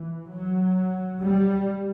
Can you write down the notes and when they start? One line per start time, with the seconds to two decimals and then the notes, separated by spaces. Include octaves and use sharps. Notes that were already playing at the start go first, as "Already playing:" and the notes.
Already playing: E3
0.30 F#3
1.20 G3